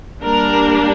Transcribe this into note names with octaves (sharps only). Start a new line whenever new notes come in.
G3 A#3 D4 A#4